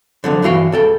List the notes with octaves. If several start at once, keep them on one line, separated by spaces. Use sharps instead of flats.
D3 F3 F#3
G2 E3 F#4 F5 G5
C#2 A4 G5